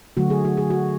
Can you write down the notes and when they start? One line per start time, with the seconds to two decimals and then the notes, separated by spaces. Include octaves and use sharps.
0.17 D3 F#3 A3 F#4
0.30 G#4
0.45 F#4
0.57 G#4
0.70 F#4